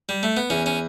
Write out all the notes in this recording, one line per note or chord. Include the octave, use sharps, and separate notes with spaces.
G3
A3
B3
E2 C#4
C#4